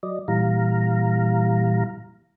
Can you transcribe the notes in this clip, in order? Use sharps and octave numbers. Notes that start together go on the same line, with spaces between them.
F#3 D5 D#5
A#2 E3 G3 F5 A#5